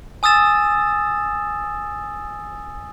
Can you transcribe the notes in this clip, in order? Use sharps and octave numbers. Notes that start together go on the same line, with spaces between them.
G#5 D#6 E6 A6 E7